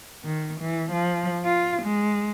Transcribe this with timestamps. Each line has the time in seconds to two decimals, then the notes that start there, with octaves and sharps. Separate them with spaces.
0.24 D#3
0.60 E3
0.92 F3
1.45 F4
1.82 G#3